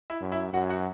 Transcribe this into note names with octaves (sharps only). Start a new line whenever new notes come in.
E4 E5
F#2
E4 E5
F#2 F#4 F#5
F#4 F#5